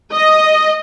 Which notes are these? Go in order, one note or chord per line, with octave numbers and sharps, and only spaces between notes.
D#5